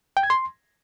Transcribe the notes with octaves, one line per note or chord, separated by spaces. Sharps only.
G5
G#6
C6